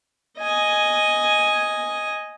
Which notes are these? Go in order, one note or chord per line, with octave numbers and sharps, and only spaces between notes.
D#5 G#5